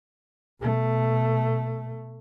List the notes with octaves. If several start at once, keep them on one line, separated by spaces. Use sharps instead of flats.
B2 A3